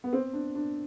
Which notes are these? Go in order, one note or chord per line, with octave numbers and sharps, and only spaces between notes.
B3
C4
D4
D4